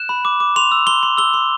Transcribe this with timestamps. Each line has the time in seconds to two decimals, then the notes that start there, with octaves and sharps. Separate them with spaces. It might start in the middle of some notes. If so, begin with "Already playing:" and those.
Already playing: F#6 E7
0.09 B5
0.25 D6
0.40 D6
0.56 C6 F7
0.72 E6
0.87 C6 G7
1.03 C6
1.17 E6 G7
1.34 C6